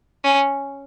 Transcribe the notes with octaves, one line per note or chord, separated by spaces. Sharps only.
C#4